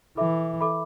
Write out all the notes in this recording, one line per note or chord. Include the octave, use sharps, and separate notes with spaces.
E3 A4 E5 B5 D6
A4 E5 B5 D6